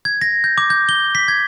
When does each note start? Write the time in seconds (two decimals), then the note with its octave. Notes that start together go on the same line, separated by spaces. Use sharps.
0.05 G#6
0.22 A#6
0.44 G6
0.58 D6
0.70 G6
0.89 G7
1.15 B6
1.28 G#6